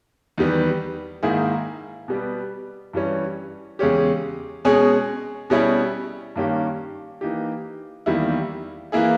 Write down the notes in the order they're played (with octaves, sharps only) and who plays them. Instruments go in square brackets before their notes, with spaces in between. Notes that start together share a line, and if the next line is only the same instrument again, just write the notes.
[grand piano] E2 D#3 G3 B3
G#2 D#3 A#3 E4 G#4
B2 G3 B3 G4
G2 E3 G3 C#4
E2 C#3 G#3 C#4 G4
B2 G#3 C#4 G#4
B2 G3 C#4 E4 G#4
G2 D#3 A#3 C#4 G4
E3 A#3 D#4 G4
E2 D#3 G3 A#3 E4
E3 A#3 E4 G#4